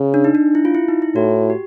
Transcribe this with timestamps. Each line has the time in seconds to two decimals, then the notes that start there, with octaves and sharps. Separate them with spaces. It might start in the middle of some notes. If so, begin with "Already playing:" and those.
Already playing: C#3
0.14 D4
0.24 D#4
0.35 D4
0.55 E4
0.65 F4
0.75 E4
0.88 D#4
1.02 E4
1.15 A2 F#4
1.50 G4